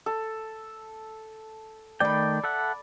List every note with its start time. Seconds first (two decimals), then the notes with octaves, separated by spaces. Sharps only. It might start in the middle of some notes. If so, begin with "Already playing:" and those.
0.06 A4
2.00 D#3 A3 D5 G5 B5
2.44 A4 E5 F#5